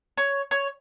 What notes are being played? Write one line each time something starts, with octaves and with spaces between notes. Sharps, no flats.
C#5
C#5